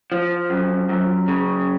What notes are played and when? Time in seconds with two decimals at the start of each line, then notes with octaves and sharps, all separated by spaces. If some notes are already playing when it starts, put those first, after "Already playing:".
0.12 F3
0.50 F#2
0.89 F#2
1.28 C#3